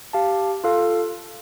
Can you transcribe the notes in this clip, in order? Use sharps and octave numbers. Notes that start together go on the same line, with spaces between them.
G4 F5 A5
F4 A4 F5